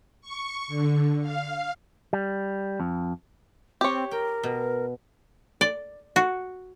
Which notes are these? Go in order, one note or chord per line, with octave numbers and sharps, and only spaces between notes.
C#6
D3
F5
G3
F2
C4 G4 C#5
A#4 G5
B2
D5
F#4